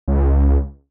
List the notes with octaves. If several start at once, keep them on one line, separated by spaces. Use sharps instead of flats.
C#2